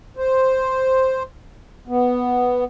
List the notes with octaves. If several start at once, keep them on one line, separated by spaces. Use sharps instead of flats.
C5
B3